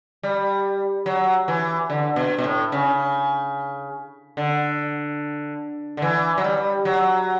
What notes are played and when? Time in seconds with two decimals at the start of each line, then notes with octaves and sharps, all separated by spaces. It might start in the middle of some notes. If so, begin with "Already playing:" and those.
0.23 G3
1.06 F#3
1.48 E3
1.90 D3
2.16 B2
2.38 B2
2.44 A2
2.72 C#3
4.37 D3
5.97 D3
6.02 E3
6.38 F#3
6.44 G3
6.85 F#3